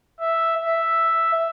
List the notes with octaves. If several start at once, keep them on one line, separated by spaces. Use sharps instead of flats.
E5
E5